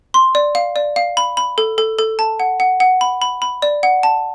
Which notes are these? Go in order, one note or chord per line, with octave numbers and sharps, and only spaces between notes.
C6
D5
F5
D5
F5
B5
B5
A4
A4
A4
A5
F#5
F#5
F#5
B5
B5
B5
D5
F#5
A5